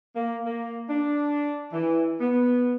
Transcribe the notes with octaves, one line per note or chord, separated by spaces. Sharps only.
A#3
A#3
D4
E3
B3